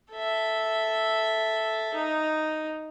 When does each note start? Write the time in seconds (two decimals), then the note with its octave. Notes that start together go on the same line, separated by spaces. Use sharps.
0.12 A4 E5
1.94 D#4